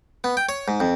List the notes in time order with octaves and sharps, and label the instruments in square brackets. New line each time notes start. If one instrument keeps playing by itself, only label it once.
[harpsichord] B3
G5
C#5
G#2
F2